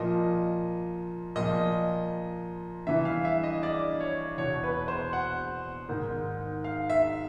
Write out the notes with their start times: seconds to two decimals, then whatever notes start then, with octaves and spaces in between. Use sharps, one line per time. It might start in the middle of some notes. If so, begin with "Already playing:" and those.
Already playing: A#2 F3 D#5
1.36 A#2 F3 D#5
2.87 G2 E3 E5
3.05 F5
3.25 E5
3.43 D#5
3.63 D5
4.00 C#5
4.37 E2 B2 C#5
4.63 B4
4.88 C5
5.13 F#5
5.89 G#2 D#3
6.64 F5
6.90 E5